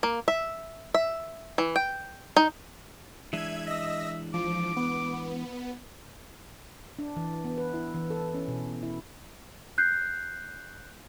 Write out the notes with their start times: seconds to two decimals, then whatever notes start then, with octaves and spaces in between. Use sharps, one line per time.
0.03 A#3
0.28 E5
0.94 E5
1.58 E3
1.76 G5
2.37 D#4
3.33 E3 G#3 D4 E5 G#6
3.67 D#5 E5 E6 A#6
4.34 F3 D6
4.76 B3
6.99 D4
7.16 E3
7.45 B3
7.58 B4
7.74 E4
7.94 E3
8.10 A4
8.34 C#4
8.48 B2
8.83 E4
9.78 F#6 G6 C7